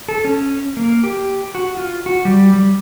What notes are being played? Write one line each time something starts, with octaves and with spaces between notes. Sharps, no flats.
A4
C#4
A#3
G4
F#4
F4
F#4
G3
G3